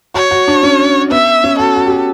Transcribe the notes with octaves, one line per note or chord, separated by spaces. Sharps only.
F#4 C#5
F#4
D4
C#4
B3 E5
C#4
F#4 A4
F#4
G4
F#4